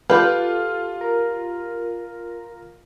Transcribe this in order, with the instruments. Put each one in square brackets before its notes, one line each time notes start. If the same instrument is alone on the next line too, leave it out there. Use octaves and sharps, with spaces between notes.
[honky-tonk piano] F4 [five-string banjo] G4 B4 [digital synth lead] A4
[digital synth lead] A#4